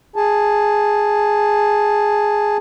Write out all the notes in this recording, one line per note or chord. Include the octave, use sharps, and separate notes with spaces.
G#4 A5